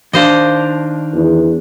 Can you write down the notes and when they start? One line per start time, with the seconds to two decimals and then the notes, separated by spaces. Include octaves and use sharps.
0.13 D#3 D4 C5 D#5 F5
1.15 E2